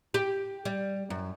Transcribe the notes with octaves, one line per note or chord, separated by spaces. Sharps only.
G4
G3
F#2